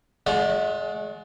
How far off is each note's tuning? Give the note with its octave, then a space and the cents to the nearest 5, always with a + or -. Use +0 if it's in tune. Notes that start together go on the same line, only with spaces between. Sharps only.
G#3 +30 F#4 -35 D5 -10